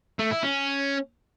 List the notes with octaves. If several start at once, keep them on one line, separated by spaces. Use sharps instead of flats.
A3
E4
C#4